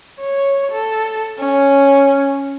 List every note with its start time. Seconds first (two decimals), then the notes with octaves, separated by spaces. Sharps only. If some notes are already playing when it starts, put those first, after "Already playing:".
0.20 C#5
0.71 A4
1.38 C#4